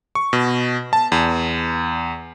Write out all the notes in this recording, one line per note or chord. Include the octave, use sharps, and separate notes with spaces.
C#6
B2
A5
E2